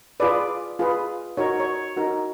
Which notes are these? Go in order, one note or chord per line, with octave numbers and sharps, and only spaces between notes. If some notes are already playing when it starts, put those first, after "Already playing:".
F4 G#4 B4 D5
F4 G#4 B4
D#4 F#4 A#4 C#5
C#5
D#4 F#4 A#4